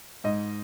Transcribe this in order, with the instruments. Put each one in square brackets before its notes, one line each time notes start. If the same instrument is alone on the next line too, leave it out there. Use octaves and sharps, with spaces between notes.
[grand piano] G#2 D#5